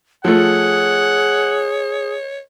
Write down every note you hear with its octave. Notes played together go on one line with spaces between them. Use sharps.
F3 A3 G#4 C#5 F#5